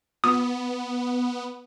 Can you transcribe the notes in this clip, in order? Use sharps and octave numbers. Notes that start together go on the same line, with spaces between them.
B3 D#6